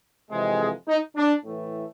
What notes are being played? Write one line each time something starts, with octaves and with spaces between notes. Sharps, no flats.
F2 C3 E3 G#3
G#4
D#4
D4
A2 E3 A3